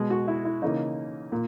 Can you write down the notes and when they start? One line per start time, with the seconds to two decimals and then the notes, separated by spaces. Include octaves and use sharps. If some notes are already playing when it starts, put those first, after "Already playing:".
Already playing: B2 G#3
0.10 F#4
0.28 E4
0.45 E4
0.62 C#3 E3 A#3 D#4
1.32 A#2